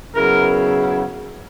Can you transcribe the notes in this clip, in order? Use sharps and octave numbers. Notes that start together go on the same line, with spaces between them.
C#3 F#3 B3 E4 A#4